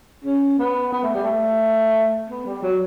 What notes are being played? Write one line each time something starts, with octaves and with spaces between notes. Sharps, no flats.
C#4
B3
B3
A3
G3
A3
B3
G3
F#3